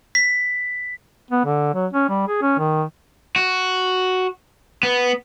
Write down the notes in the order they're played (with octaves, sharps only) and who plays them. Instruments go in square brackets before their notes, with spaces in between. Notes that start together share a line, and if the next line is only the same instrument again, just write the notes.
[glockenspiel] B6
[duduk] B3
D3
F#3
C#4
G3
G#4
C#4
D#3
[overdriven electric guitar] F#4
B3